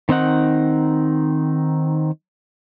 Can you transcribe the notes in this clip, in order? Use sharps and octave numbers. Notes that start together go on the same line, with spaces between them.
D#3 C4 D#4 F#5